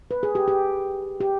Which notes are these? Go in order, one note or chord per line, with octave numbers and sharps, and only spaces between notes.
B4
G#4
G4
G4
G4